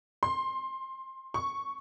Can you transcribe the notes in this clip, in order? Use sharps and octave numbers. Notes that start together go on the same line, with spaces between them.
C6
C#6